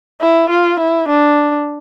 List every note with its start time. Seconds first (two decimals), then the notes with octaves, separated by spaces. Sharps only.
0.21 E4
0.51 F4
0.80 E4
1.09 D4